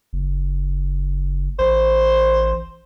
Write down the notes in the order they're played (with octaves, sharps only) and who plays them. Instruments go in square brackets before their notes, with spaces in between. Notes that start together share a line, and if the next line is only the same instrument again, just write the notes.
[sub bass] F#1
[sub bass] A1 [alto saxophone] C5